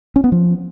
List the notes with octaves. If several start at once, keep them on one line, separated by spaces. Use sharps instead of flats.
C#4
B3
F3